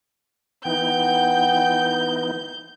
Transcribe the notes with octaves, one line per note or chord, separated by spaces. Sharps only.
E3 B3 D#4 F#5 G5 G6